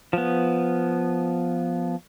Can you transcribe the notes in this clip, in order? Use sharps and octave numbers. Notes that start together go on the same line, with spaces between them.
F3 B3